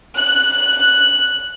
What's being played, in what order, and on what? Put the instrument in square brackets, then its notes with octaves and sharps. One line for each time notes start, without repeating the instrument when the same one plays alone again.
[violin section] F#6